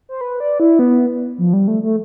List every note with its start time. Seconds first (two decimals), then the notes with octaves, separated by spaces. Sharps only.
0.09 C5
0.21 B4
0.40 D5
0.60 E4
0.79 B3
1.38 F3
1.53 G3
1.68 A3
1.83 A3